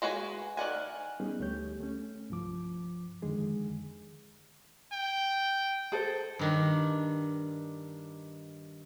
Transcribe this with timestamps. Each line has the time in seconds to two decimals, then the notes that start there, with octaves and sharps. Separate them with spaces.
0.02 G#3 F#4 B4 G#5
0.57 D#3 D5 F#5 G#5
1.20 G3 B3 C#4 D#4 G#4
1.40 D2 A3 G4 C#5 G6
1.80 A3 C#4
2.30 C2 G2 F3 D6
3.22 F2 D3 D#3 G#3 G#4
4.92 G5
5.92 G#4 A4 C5
6.39 G2 D#3 D4